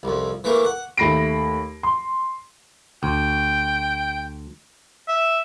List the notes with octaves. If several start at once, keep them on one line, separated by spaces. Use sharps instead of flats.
C2 F2
E3 A3 A#3
F#5
D#2 A3 B5 A#6 C7 D7
C6
D2 G5
E5